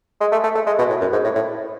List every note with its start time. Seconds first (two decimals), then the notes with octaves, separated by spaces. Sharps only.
0.21 G#3
0.32 A3
0.44 A3
0.55 A3
0.66 G#3
0.78 B2
0.89 A2
1.01 F#2
1.12 G#2
1.24 A2
1.35 A2